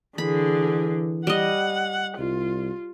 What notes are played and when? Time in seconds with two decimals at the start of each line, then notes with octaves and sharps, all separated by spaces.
0.18 D3 E3 G#4 B5
1.27 G3 D#5 F#5
2.18 C2 F4